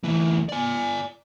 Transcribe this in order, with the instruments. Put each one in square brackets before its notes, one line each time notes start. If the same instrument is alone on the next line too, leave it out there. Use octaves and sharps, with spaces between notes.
[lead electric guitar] D2 E3
D5 G#5